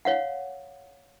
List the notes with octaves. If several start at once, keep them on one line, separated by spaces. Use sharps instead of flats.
C#5 F5 F#5